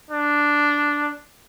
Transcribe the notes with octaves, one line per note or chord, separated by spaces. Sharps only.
D4